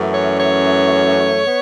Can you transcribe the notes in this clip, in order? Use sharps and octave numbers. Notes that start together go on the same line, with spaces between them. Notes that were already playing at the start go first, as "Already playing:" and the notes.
Already playing: F#2 E3 A3 C#4
C#5
C#5
B3